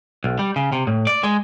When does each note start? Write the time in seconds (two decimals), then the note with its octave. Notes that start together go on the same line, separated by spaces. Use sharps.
0.24 B1
0.39 G3
0.56 C#3
0.72 C3
0.87 A2
1.07 D5
1.24 G#3